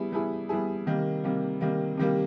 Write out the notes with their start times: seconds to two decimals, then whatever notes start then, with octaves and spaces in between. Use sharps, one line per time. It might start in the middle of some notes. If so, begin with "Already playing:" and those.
Already playing: G3 B3 E4 G#4
0.12 G3 B3 E4 G#4
0.49 G3 B3 E4 G#4
0.86 C3 D#3 G3 A#3
1.24 C3 D#3 G3 A#3
1.61 C3 D#3 G3 A#3
1.97 C3 D#3 G3 A#3